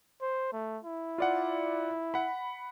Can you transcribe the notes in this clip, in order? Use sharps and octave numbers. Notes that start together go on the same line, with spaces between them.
C5
A3
E4
F4 D5 F#5
F#5 B5